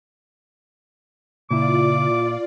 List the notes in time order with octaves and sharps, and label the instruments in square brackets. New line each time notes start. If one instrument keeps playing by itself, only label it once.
[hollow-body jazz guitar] A#2 E4 [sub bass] C#3 [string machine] F4 D5 [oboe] D6